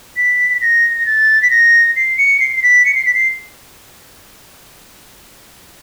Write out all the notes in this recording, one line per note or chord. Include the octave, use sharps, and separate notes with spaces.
B6
A#6
A#6
A6
B6
A#6
C7
C#7
C7
C7
B6
C#7
C7
B6
C7